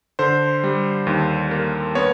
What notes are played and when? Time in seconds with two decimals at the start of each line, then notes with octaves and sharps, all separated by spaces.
0.19 D3 C5
0.64 G3
1.07 D#2
1.51 A#3
1.95 B3 C#5